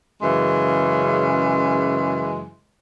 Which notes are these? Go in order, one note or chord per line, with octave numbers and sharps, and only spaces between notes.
F#2 C#3 E3 G#3